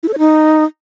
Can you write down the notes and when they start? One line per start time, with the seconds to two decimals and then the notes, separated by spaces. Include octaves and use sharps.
0.03 E4
0.08 A4
0.13 C#5
0.19 D#4